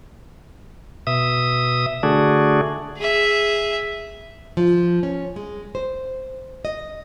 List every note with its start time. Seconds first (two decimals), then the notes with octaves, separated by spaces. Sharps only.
1.07 B2 E5 D#6
2.03 D3 A3 D4 F#4 G#4
2.97 G#4 E5
4.57 F3
5.03 C#4
5.36 G#3
5.75 C5
6.65 D#5